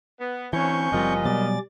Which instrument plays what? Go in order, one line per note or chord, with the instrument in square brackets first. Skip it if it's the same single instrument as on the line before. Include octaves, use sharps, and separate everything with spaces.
[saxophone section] B3
[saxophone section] D2 C#4 C#5 [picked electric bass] E3 [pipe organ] C4 C#6 G6 [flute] G#5
[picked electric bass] F#1 F3 G3 [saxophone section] A#2 A#4 D#5
[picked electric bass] B2 F#3 B3 [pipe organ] G3 D5 A6